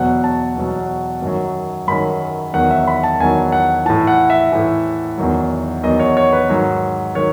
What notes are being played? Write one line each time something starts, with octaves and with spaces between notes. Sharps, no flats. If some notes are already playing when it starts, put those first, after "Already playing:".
Already playing: E2 B2 F#3 F#5
A5
E2 B2 F#3
F#2 D#3 F#3
F#2 D#3 F#3 B5
E2 D#3 F#3 F#5
E5
B5
A5
E2 D#3 F#3 G#5
F#5
A2 E3 A5
F#5
E5
A2 E3
E2 D#3 F#3
E2 D#3 F#3 D#5
C#5
C#5
B4
G#2 D#3 F#3
D#3 F#3 C#5